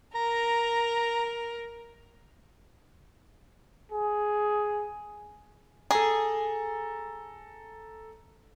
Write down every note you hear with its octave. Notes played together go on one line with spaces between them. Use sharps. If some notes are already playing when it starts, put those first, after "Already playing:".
A#4 A#5
G#4
G#4 A4 A#5